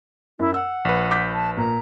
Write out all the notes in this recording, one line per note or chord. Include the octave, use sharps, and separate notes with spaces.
F#2 E4
F#5 E6
A#1 B4
D6 G6 B6
A5
A#2 A#5